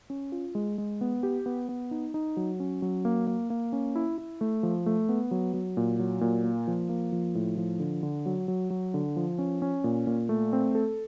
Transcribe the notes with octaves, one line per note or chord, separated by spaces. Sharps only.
C#4
F4
G#3
G#3
B3
G4
B3
B3
D#4
D#4
F#3
C#4
F#3
A#3
A#3
A#3
C#4
E4
E4
A3
F3
A3
B3
F#3
F#3
A#2
F#3
A#2
A#3
F3
A#3
F3
A2
F3
D3
D3
F#3
F#3
F#3
D3
F3
C#4
C#4
A#2
A#2
A3
C4
A4